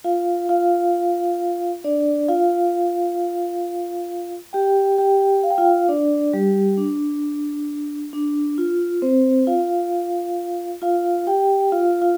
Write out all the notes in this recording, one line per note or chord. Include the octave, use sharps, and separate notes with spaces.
F4 F5
F4 F5
D4 D5
F4 F5
G4 G5
G4 G5
F5
G5
F4 F5
D4 D5
G3 G4
D4
D4
F4
C4 C5
F4 F5
F4 F5
G4 G5
F4 F5
F4 F5